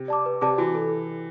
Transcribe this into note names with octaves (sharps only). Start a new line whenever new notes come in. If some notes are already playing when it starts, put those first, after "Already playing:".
Already playing: C3
D5 A5 D6
B4
C3 D5 A5 D6
E3 F#4
A4